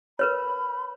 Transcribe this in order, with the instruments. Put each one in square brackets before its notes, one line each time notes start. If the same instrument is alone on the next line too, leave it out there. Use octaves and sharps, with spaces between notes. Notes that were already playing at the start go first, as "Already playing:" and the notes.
[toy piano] A#4 B4 C#5 [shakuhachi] B5